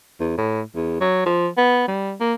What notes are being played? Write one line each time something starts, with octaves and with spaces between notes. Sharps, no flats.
E2
A2
E2
F#3
F3
B3
G3
A#3